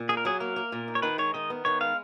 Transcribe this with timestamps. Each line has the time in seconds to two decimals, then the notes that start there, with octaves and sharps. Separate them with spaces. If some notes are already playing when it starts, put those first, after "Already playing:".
Already playing: A#2
0.09 A#3 G#4
0.17 A#4
0.25 F#3 G#4
0.40 A#3 A#4
0.56 A#3
0.72 A#2
0.88 D#4
0.95 C#5
1.02 D#3 B4
1.18 G#3 C#5
1.34 D#3 D#5
1.50 B3
1.65 D#3 C#5
1.81 G#3 F5